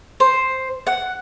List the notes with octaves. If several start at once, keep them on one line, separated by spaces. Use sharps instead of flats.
C5
F#5